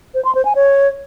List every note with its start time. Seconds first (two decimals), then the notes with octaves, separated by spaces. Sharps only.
0.14 C5
0.25 C6
0.35 C5
0.45 G#5
0.55 C#5